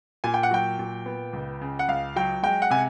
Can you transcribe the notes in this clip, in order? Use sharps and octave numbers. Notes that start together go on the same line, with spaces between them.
A#2 G#5
G5
F#5
F#3 G5
A#2
B3
C#2
C#3
F#5
C#2 F5
F#3 G5
G#3 G5
F#5
C3 G#5